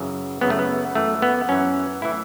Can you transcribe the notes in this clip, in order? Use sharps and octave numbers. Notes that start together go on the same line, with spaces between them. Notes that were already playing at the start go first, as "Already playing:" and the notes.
Already playing: F#2 C#3 E3
F#2 C#3 E3 B3
A3
B3
F#2 E3 A3
B3
F#2 E3 C#4
A2 E3 E4